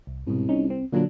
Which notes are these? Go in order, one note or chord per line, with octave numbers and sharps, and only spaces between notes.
C2
C2 G#2 B2
C#4 D#4
C4
A#2 D3 F#3 D4